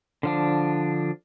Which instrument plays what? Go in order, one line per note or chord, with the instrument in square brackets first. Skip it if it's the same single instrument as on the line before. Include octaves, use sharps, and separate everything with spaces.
[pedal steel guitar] D3 F3 D4